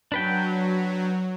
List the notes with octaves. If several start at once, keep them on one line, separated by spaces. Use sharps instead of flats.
F#3 D4 B4 G5